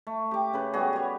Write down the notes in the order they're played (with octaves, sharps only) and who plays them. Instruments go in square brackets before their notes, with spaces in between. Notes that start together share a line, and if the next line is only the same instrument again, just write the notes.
[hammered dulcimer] A3
G4 D6
C#3 B4
G3 B3 F#4 G#4
G4 C#5